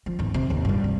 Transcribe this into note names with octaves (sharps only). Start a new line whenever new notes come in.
F3
G#1 E2
C3
D#2
G2 A#2
C3